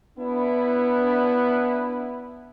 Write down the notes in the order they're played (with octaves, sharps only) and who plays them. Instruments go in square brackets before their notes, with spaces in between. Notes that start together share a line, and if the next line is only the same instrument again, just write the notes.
[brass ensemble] B3 D4 E4